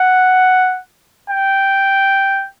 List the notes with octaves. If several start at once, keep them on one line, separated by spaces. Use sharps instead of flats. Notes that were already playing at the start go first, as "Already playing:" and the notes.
Already playing: F#5
G5